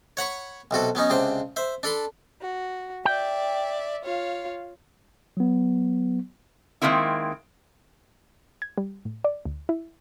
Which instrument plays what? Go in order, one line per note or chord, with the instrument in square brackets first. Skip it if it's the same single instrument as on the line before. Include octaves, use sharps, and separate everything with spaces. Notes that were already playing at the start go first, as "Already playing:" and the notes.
[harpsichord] C#5 F#5 B5 C#6
B1 C3 F#4 A4
F#3 B3 C#4 D#4
C#2 C3 D4 C5
C5 E5
D4 A4 B5 C6
[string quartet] F#4
[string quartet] D5 E5 [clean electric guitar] G5
[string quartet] F4 C#5 F5
[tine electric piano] F#3 B3
[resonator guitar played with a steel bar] D#3 F#3 G#3 A#3 C4 E4
[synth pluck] G#6
G3
A2
D5
D2
E4